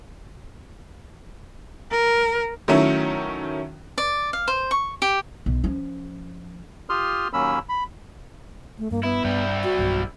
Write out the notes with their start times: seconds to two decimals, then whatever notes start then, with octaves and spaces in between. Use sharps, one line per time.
1.91 A#4
2.68 D#3 F#3 A3 C#4 E4
3.98 D5
4.33 F5
4.48 C5
4.71 C#6
5.02 G4
5.46 B1
5.64 F3 C#4
6.90 F4 G4 C6 D#6 F6
7.33 D#2 F#3 A#3 C#4 B5 E6
7.69 B5
8.79 A3
8.91 G2 A#3
9.03 B3 E4
9.25 G2 G3 E4
9.64 F#4
9.79 B1 G2 B2